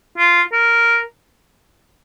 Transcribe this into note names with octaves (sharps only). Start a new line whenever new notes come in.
F4
A#4